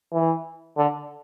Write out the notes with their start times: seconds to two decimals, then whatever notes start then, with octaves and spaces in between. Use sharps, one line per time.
0.13 E3
0.77 D3